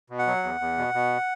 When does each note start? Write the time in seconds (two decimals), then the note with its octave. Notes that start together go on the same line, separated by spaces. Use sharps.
0.10 B2
0.19 F#5
0.27 F#3
0.43 E2
0.60 E2
0.78 B2
0.94 B2